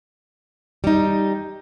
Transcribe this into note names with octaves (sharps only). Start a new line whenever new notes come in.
G3 D#4